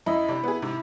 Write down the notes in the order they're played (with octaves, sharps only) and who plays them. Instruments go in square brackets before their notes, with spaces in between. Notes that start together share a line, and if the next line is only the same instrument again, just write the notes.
[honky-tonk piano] F#2 D#5 [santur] E4
[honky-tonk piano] C3 D4
B3 G#4
G#2 C3